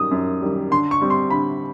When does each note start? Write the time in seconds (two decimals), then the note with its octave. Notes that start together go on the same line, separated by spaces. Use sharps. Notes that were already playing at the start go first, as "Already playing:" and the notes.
Already playing: F#2 D#3 G3 D#6
0.11 F#2
0.42 D#3 G3
0.71 D3 C6
0.91 C#6
1.01 G3 C4
1.10 C6
1.30 D3 B5